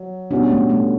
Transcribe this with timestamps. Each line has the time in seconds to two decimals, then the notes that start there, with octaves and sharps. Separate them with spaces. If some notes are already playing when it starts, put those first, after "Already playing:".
Already playing: F#3
0.31 B2 G3 C#4 D4 F#4
0.50 A3
0.69 A3